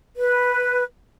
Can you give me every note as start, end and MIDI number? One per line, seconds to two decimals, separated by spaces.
0.16 0.83 71